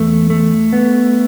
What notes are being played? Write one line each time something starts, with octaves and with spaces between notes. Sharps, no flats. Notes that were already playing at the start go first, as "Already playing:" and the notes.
Already playing: E2 A3
A3
B3